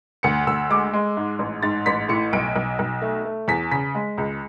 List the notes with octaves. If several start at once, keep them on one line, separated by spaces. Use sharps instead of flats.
D2 C#7
D2 E6
G#3 D6
G#3
G#2
A1
G#2 A6
A1 B6
A2 C#7
B1 D7
B1
B1
A3
A3
E2 B6
C#3 B6
G#3
C#2